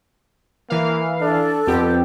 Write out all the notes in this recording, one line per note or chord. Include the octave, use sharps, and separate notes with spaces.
E3 A#3 F5
D4 A4
F2 B3 G4